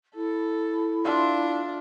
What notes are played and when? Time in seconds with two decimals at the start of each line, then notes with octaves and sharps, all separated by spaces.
0.15 E4 A4
1.05 D4 F4 E5